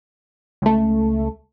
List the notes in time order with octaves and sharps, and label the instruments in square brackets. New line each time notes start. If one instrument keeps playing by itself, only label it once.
[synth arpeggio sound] C#2 A3